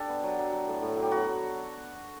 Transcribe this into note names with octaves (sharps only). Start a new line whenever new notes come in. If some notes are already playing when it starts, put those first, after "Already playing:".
Already playing: D4 G4 A4
B3
F#3
F#3
F#3
A2
A2
F#3
G4
B3 F#4